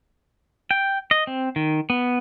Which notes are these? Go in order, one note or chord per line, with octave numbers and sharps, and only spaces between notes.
G5
D#5
C4
D#3
B3